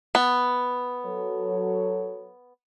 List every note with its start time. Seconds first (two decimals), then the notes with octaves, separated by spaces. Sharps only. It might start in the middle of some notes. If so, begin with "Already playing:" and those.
0.15 B3
1.06 F#3 A4 C#5